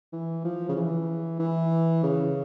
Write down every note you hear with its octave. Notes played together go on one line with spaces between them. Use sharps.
E3
F3
C#3
E3
E3
C#3